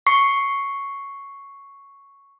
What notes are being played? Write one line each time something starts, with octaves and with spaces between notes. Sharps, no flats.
C#6 C7